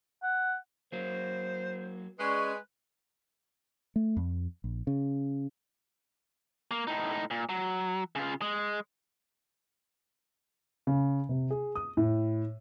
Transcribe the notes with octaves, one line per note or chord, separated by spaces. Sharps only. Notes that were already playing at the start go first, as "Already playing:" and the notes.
F#5
F#3 A#3 C5
G#3 C#4 B4 D5 C#6
A3
F2
A#1
C#3
A#3
A2 D#4
A#2
F#3
C#3 F4
G#3
C#3
C3
G#4
D#6
A2